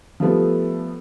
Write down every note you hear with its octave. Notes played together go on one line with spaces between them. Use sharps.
F3 G3 A3 B3